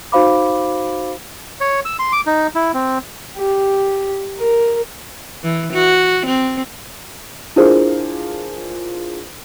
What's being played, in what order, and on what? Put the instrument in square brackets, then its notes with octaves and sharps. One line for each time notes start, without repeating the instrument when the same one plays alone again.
[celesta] D#4 F#4 C5 F5 B5 D6
[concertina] C#5
E6
C6
D6
D#4
E4
C4
[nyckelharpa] G4
A#4
[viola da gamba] E3
F#4
C4
[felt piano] D4 E4 F4 G#4 A#4 C5